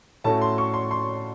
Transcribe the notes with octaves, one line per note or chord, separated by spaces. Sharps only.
A2 A3 C#4 F#4 A5
C6
C#6
C6
C6